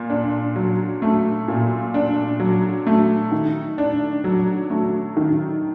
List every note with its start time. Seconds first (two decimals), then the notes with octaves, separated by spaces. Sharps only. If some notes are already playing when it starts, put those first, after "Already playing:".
Already playing: A#2
0.10 D4
0.56 F#3
1.02 A3
1.48 A#2
1.94 D4
2.40 F#3
2.87 A3
3.32 D#3
3.78 D4
4.24 F#3
4.70 A3
5.17 D#3